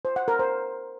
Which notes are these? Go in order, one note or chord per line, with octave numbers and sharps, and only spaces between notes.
C5
F#5
A#4
C5